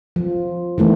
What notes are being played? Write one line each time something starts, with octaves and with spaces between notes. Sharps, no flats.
F3
D#3 E3 A3 B3